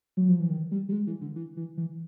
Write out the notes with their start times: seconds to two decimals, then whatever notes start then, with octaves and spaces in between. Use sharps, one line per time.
0.17 F#3
0.28 F3
0.40 E3
0.50 D#3
0.71 G3
0.89 G3
0.92 G#3
1.07 E3
1.21 D3
1.36 E3
1.57 E3
1.77 E3